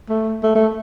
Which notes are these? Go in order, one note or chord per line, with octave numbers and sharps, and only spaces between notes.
A3
A3
A3